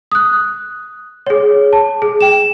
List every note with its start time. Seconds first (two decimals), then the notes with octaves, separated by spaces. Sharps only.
0.12 D#6 F#6
1.26 G#4 C#5
1.73 A5
2.02 G#4
2.21 G5 E7